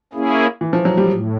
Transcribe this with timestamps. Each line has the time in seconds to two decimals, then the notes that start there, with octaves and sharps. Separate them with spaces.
0.13 A#3 C#4 E4 G#4
0.61 E3
0.73 F3
0.85 F#3
0.97 G3
1.09 A2